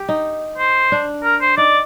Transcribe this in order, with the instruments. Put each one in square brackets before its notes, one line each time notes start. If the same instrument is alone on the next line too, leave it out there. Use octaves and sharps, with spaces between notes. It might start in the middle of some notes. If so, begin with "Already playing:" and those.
Already playing: [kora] G4
D#4
[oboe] C5
[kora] D4
[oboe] A#4
C5
[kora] D#4 [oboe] D5